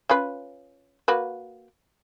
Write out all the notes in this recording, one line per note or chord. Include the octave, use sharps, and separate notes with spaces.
C#4 F4 B4
A#3 F#4 B4